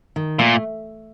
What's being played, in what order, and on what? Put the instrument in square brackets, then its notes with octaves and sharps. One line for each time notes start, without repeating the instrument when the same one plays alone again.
[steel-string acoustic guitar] D#3
[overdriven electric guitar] A#2 [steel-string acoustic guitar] A3